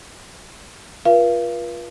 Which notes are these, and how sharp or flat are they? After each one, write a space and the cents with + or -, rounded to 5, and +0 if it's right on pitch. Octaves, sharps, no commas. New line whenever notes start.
F4 +0 B4 -40 F5 -40